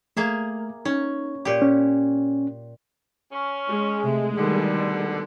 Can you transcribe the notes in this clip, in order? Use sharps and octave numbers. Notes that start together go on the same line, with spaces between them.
A3 A#3 G#4 E5
C#4 D#4
A#2 G4
C#4
C#4
G#3
C3 A3
B2 D3 D#3 G3